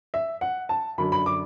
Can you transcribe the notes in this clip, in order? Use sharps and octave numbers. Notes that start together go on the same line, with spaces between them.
E5
F#5
A5
F#2 D3 F#3 B5
B5
D6